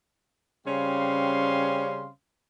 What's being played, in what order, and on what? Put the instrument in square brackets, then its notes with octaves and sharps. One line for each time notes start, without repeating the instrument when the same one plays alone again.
[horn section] C#3 G3 C4 C#4 F5 C6